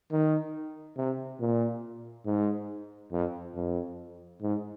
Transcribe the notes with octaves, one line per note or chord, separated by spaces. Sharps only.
D#3
C3
A#2
G#2
F2
F2
G#2